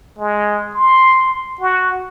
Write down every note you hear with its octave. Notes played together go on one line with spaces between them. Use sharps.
G#3
C6
F#4